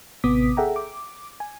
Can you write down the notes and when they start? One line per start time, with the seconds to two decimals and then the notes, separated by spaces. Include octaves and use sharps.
0.24 A1 C3 B3 D6 D#6 B6
0.57 G#4 A4 E5 F#5 G5 A#5
0.76 D6
1.40 G#5